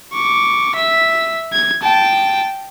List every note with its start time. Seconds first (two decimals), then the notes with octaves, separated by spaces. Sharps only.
0.13 C#6 D6
0.76 E5 B6
1.53 G#6
1.82 G5 A5